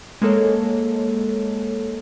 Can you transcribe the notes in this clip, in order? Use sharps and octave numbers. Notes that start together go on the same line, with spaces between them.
G#3 A#3 A4 C#5